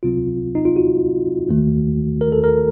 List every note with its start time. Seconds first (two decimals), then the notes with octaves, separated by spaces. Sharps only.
0.03 C#2 C3 F#3 C4 F4
0.55 D#4
0.65 F4
0.76 F#4
1.49 D#2 D#3 A3
2.21 A#4
2.32 A4
2.44 A#4